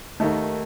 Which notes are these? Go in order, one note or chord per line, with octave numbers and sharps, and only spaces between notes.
D#2 D#3 A3 D#4